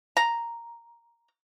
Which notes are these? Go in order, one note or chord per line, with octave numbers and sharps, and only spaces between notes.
A#5